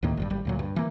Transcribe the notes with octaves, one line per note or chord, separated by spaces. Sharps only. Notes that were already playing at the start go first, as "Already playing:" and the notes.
D2 A2 D#3 A#3
G#1 G2 G3
G#1 G3
D2 A#2 F#3
G2
E3 A#3